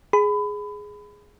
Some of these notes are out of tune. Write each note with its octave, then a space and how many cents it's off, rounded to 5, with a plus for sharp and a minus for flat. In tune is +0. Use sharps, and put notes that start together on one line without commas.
G#4 +0 B5 +25